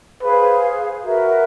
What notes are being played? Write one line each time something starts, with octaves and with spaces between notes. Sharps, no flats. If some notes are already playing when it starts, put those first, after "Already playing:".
G#4 B4 C5 F5
F#4 A#4 B4 E5